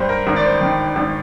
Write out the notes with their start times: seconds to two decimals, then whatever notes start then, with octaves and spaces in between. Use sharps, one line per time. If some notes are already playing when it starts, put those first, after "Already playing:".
Already playing: G2 C5
0.09 A#4
0.27 G#1 A#4
0.36 D5
0.45 C5
0.61 D#3
0.96 G#1